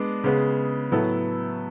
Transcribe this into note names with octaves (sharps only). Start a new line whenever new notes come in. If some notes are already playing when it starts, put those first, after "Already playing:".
Already playing: G#3 B3 D4
C#3 G#3 B3
A2 F#3 B3 E4 A4